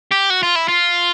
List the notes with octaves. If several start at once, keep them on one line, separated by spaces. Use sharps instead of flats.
G4
F#4
F4
E4
F4